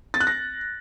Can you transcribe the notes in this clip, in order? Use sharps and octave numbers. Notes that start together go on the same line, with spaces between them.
A6
F#6
A#6